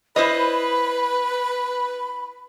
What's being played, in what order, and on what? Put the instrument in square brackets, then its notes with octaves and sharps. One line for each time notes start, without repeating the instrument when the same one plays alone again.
[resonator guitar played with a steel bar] E4 C5 D#5 [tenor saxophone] B4 [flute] B5